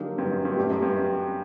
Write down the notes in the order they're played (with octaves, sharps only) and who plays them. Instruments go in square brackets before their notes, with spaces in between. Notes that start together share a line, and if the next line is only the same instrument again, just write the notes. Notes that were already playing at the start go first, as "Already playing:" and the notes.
Already playing: [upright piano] D3 F#3 A#3 D#4 G4
[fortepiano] G2
F#2
G2
[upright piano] A3 D4 G4
[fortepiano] F#2
G2